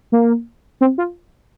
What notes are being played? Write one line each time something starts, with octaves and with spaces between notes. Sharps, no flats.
A#3
C4
F4